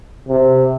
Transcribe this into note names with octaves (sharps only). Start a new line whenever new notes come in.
C3